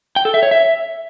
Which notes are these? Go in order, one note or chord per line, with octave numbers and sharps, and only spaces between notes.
G5
A4
E5
C#5
E5